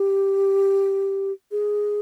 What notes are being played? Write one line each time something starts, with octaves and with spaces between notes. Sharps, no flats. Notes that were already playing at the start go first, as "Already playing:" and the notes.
Already playing: G4
G#4